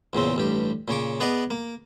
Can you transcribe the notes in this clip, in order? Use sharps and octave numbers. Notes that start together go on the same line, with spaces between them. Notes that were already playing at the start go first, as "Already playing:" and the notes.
E2 A#2 C#3 C4
A1 G2 G4
A#2 C#3 C#5 D6
B3 G#4 B4 D5 D#5 D6
A#3